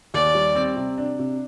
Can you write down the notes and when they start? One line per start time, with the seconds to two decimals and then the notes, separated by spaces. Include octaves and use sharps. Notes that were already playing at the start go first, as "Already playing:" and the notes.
0.14 D#2 D5
0.35 G3
0.55 C4
0.76 C3
0.98 D4
1.19 C3